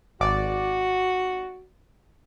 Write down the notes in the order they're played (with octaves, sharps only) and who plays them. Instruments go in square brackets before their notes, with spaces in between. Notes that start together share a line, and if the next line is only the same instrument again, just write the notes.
[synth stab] G#1 D5 [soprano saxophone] F#4